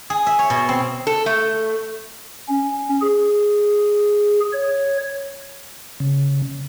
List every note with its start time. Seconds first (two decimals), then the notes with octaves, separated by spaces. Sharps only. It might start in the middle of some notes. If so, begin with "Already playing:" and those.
0.10 G#4
0.26 E5
0.39 C#5
0.50 B2
0.69 C4
1.07 A4
1.26 A3
2.48 C#4
3.01 G#4
4.53 C#5
6.00 C#3